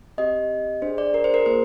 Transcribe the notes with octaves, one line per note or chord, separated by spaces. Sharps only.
C4 G4 D#5
D4 G#4 C5
D5
A#4
C5
A#4
A#3 F4 G#4 C5